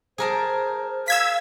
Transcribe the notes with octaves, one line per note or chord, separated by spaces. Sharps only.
G#4 A#4 C5 A5
F5 E6 G#6 B6